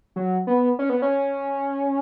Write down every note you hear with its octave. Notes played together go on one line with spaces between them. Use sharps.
F#3
B3
C#4
B3
C#4